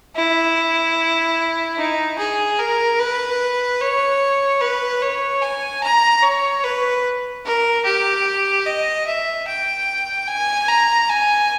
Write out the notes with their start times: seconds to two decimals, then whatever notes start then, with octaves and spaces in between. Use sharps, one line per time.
0.16 E4
1.78 D#4
2.18 G#4
2.59 A#4
3.00 B4
3.81 C#5
4.61 B4
5.02 C#5
5.42 G#5
5.83 A#5
6.23 C#5
6.64 B4
7.45 A#4
7.85 G4
8.66 D#5
9.07 E5
9.48 G5
10.28 G#5
10.68 A#5
11.10 G#5